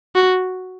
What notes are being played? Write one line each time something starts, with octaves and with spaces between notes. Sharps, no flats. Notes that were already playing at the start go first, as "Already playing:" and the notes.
F#4